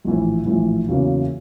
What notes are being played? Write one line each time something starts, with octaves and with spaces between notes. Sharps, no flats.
A#1 A2 E3
A#1 A2 E3
E2 C#3 F#3 A#3